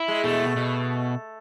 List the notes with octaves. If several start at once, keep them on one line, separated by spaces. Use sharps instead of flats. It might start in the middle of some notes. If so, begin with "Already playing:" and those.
Already playing: E4
G#3
B2 A3
B2